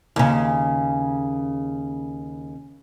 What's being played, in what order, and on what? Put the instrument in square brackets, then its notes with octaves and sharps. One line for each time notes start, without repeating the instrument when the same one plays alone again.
[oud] D#2 C#3